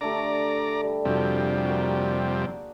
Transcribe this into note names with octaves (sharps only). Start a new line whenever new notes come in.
D3 A3 G4 D5 A#5
G3
F2 C3 G3 D4 F#4 G#4
A#3 F#4